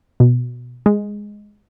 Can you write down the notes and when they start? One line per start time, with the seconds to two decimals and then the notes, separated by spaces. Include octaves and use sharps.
0.20 B2
0.86 G#3